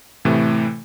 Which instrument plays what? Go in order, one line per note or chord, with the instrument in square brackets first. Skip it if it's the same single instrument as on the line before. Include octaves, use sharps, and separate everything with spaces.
[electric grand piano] A2 C3 E3 A3